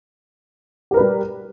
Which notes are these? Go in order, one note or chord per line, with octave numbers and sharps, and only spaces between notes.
G3 G4 A#4 B4